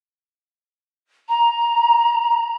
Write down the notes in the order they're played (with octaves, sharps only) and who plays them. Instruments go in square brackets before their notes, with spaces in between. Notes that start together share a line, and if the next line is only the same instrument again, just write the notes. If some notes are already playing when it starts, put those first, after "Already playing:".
[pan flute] A#5